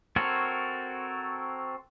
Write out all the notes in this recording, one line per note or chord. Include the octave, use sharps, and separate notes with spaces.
C4 F#4 A4 A#4 C#5